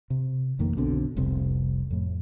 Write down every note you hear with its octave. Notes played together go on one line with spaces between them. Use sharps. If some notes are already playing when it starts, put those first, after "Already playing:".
C3
A1 F2 D#3 A#3
B1 B2 D3 C4
F1 C2 C4
F2 A2